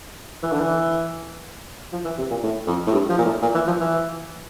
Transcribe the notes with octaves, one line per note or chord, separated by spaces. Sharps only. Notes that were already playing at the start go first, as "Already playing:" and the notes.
E3
D3
E3
F3
E3
C3
A#2
A2
F2
A2
G2
F3
A#2
A2
A#2
E3
F3
E3